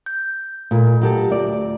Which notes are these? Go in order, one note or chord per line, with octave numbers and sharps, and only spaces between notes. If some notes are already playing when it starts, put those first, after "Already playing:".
G6
A#2 A3 F4
F#3 G4 A4
D2 D5